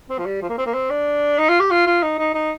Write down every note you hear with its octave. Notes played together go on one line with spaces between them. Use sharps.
C4
F3
G3
F3
A#3
C4
A#3
C4
D4
D#4
F4
G4
F4
F4
D#4
D#4
D#4